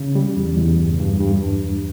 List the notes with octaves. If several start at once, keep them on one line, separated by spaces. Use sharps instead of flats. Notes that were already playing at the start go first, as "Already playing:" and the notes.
Already playing: C#3
G3
E2
E2
G2
G2
G2